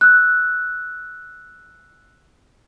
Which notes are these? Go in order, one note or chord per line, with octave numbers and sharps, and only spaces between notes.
E6 F#6